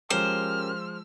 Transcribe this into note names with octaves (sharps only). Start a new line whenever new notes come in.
F3 G#3 C#4 G4 A#4 C5 F6